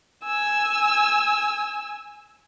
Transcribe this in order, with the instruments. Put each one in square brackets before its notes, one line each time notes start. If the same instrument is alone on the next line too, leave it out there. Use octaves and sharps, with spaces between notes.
[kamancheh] G#5 E6